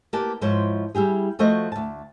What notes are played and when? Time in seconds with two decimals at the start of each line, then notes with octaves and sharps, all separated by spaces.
0.13 A#3 G4 B4 A5
0.41 G#2 F3 E4 C5 C#5
0.95 G3 E4 G4 G#4
1.39 F3 A3 F#4 C5 D#5
1.72 D2 A5